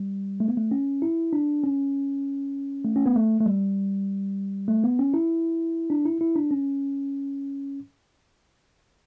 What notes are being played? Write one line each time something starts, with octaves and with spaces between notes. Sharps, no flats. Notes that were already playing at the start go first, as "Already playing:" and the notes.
Already playing: G3
A3
B3
A3
C#4
E4
D4
C#4
A3
C#4
B3
A3
A3
G3
A3
B3
C#4
E4
D4
E4
E4
D4
C#4